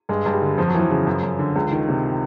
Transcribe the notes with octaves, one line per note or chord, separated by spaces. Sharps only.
G2 G#3
G2
G3
D3
F2 F3
F#3
E3 F3
C#3
F#2
F#2
D3
C#2
D#3
C3